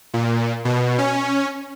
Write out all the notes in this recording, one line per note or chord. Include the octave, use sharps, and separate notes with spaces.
A#2
B2
C#4